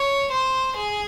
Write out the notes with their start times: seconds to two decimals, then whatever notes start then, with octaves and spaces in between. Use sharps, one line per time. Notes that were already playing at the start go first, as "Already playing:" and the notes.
Already playing: C#5
0.31 C5
0.75 G#4